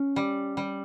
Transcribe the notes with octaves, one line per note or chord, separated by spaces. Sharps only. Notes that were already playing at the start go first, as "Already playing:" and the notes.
Already playing: C#4
G3
G3